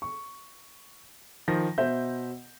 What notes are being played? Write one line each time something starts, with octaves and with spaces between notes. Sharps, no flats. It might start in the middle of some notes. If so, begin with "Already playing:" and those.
C#6
D#3 F3 A#6
B2 C5 E5 G6